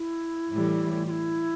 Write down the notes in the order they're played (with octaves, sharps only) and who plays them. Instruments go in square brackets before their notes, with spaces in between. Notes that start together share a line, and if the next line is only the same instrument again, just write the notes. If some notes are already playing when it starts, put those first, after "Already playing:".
Already playing: [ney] E4
[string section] A2 E3 G3
[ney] F4
E4